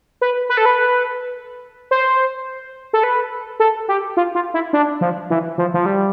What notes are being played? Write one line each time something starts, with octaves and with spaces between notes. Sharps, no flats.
B4
B4
A4
B4
C5
A4
B4
A4
G4
F4
F4
E4
D4
F3
E3
F3
F3
G3